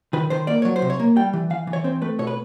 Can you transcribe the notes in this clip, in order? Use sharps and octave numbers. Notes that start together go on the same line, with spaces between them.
D#3 B4
D#3 C5
A#3 D5
F#3 C#5
C5
C3
C#5
A#3
G3 G5
E3
E3 F5
E3
C#5
C4 C5
A3 B4
B2 C#5
B4